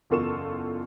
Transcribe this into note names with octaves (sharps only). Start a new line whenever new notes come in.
F#1 E2 F4 A4 C#6 E7